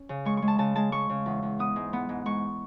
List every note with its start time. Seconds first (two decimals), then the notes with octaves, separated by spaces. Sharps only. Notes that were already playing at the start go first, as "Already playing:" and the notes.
Already playing: C#4
0.09 C#3
0.25 G#3 C#6
0.37 C#6
0.42 G#3
0.48 A5
0.58 C#3 A5
0.76 G#3 A5
0.92 G#3 C#6
1.09 C#3
1.26 E2
1.42 E2
1.59 B3 D#6
1.76 G#2
1.93 B3
2.09 G#2
2.26 G#2 C#6